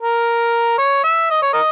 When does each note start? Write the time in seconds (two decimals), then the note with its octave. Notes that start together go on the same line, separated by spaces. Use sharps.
0.01 A#4
0.78 C#5
1.04 E5
1.30 D#5
1.42 C#5
1.54 A#4 D#5